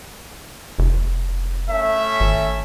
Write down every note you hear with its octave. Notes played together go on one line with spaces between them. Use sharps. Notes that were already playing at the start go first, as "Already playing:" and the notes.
F1
A3 C#4 E5
G#1